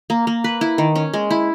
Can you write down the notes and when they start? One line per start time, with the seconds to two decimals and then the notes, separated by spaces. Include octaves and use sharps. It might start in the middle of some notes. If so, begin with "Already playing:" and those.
0.10 A#3
0.27 A#3
0.44 B4
0.61 E4
0.78 D#3
0.95 C#4
1.13 G#3
1.31 E4